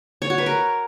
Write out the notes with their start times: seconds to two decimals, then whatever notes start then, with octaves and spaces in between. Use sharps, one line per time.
0.22 C#5
0.30 F#4
0.38 B4
0.46 A#4